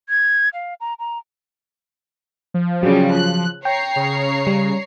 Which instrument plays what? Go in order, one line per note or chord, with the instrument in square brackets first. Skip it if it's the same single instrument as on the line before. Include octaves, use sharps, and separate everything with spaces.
[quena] G#6
F5
A#5
A#5
[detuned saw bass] F3
[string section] C#3 G3 [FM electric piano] F#3
[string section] F#6
[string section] C#5 A#5 C7 [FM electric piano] G5
[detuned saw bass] C#3
[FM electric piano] G3